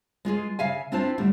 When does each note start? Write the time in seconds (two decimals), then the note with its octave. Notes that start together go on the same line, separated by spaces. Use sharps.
0.25 G#3 F4 G4 G#4
0.59 C#3 E5 F5 G#5
0.92 C4 D4 E4 F4 C5 A5
1.18 A2 D3 G3 A3 A#3